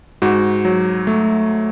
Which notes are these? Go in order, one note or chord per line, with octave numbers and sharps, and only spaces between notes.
G#2 F#4
F#3
A3